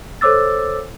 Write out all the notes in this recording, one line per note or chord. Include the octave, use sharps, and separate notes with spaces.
A4 C5 C#5 D6 E6 A6